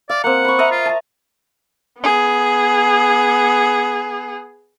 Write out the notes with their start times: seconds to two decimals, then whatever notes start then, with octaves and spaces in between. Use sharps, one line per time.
0.09 D5 F5
0.24 A#3 C4 F#5
0.45 B5 C#6
0.59 D#5 E5 A#5
0.71 F4
0.86 A5 A#5
2.00 B3 G#4